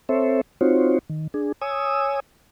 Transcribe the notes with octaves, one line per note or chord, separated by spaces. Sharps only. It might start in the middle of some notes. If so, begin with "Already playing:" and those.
C4 A4 C5 C#5 E5
C4 D#4 F4 F#4 C5 C#5
D#3
D4 G#4
C#5 G#5 D#6 E6